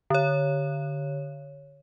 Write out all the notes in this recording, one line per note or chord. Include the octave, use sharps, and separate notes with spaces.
D3 C#5